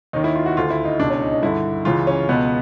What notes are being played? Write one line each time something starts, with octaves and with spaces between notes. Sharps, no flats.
D#2 D#3 D#4
E4
F4
F#4
D2 D3 F4
E4
D#4
C#2 B2 D4
C#4
D#4
D#4
G2 D3 E4
C#2 C#3 E3 F4
C#4
C#2 B2 B3